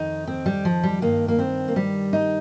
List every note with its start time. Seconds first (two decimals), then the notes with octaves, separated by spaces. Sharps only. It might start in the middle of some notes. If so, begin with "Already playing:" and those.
Already playing: F2 D#3 D#4
0.27 C4
0.46 G3
0.65 F3
0.83 G3
1.02 G2 D#3 A#3
1.28 A#3
1.39 C4
1.68 A#3
1.76 G3
2.13 D#4